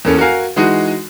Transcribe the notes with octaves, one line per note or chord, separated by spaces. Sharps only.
E2 A#3 C#4 A4
F#4 A#4 F5 G#5
E3 G#3 D#4 F#4